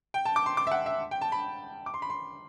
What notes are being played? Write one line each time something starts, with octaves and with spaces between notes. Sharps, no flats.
G5
A5
D6
C6
D6
E5
F#5
E5
G5
A5
B5
D6
C6
B5
C6